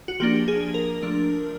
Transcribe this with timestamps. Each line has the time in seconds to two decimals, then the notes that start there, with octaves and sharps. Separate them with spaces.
0.08 F#4
0.20 F3 A#3 D4 G4
0.48 G#4
0.74 A#4
1.03 F3 A3 D4